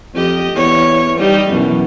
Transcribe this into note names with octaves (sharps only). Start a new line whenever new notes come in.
F2 G4 D#5
E2 C#5
G3 D#4 G4
F#2 B2 E3